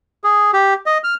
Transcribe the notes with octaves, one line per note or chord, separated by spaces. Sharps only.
G#4
G4
D#5
F6